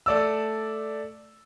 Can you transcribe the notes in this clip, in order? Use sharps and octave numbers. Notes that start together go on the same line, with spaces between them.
A3 D5 E6